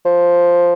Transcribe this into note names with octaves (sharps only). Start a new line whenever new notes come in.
F3